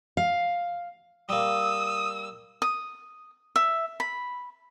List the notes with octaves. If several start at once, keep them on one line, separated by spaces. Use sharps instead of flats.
F5
G3 A#3 D#6 E6
D#6
E5
B5